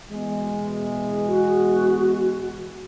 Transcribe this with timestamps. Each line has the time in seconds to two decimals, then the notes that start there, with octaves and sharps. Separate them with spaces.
0.11 B2 E3 G#3
1.28 F#4